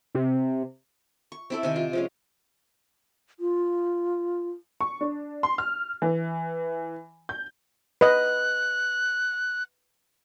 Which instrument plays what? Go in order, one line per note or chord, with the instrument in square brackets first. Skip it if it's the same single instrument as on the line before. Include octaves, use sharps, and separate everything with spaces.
[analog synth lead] C3
[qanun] C#6
C4 E4 A4
C3 D#3 G#5
F4
F3 G#3 C#4
[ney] F4
[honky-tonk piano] C#6
D4
C6
F6
E3
G6
[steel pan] B4 D#5 [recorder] F#6